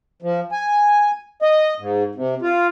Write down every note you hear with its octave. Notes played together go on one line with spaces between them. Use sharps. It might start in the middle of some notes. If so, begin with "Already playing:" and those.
F3
G#5
D#5
G#2
C3
F4